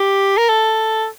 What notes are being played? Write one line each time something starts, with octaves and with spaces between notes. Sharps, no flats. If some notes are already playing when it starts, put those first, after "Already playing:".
Already playing: G4
A#4
A4